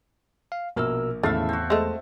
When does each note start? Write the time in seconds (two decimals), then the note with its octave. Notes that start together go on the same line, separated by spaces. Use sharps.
0.52 F5
0.76 A#1 B2 A#3 A#4 E6 F6
1.23 G#1 E2 A2 C#3 A3 E5 F5 A5
1.49 C4 F#4
1.70 G#3 A3 C5 D#5 A5